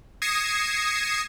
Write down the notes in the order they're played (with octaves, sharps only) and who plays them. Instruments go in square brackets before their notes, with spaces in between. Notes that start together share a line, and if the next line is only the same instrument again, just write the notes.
[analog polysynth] D#6 G#6 A#6 C7 C#7 E7